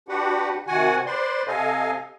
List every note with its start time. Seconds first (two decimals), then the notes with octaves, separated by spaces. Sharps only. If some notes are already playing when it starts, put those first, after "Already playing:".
0.09 D4 F#4 G4 B4 F#5
0.67 C3 D#3 F#4 F#5 G#5
1.06 B4 C5 D5 C6
1.47 C3 A4 D#5 F5 G#5